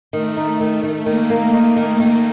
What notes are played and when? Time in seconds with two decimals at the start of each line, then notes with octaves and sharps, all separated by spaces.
0.13 D#3 A3
0.37 D#4
0.60 D#3
0.83 D#3
1.06 D#3 A#3
1.30 A#3
1.53 D#4
1.76 D#3
2.00 D#3